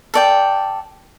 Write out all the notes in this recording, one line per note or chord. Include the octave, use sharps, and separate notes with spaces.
A4 D5 G5